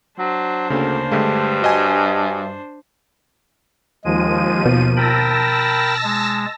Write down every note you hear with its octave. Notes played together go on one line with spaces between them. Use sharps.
F#3 D4 C5
D2 C#3 A#3
G2 D3 G#3 A3
F#4 D#5 G#5
D#2 F3 G#3 D#7
B2
A#4 G5 A5 B5 E6 A#6
G#3